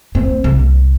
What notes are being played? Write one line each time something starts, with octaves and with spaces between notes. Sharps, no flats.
C4
C2